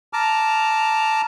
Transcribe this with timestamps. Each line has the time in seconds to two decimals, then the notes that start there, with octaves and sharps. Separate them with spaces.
0.13 A5 A#5 D6 F6